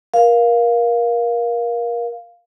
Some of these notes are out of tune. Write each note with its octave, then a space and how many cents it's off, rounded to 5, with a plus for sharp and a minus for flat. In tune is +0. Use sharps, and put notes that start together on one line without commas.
A#4 +25 F5 +0